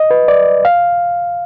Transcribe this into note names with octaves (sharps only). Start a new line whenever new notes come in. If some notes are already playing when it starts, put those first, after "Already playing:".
Already playing: D#5
B4
D5
F5